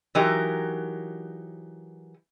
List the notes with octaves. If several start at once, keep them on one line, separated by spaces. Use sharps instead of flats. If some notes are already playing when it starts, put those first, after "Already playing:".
E3 F#3 D#4 G4 A#4